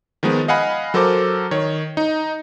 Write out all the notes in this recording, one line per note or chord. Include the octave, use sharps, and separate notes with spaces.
D#3 F3 G#3 B3
D#5 F5 F#5 G#5 B5
F#3 A4 A#4 C5 D6
D#3 C#5
D#4